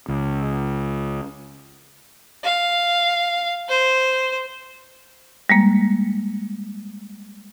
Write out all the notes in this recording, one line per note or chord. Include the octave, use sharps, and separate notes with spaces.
C#2
F5
C5
G3 G#3 A#3